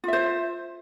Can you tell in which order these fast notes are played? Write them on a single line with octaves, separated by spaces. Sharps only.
F4 E5 C5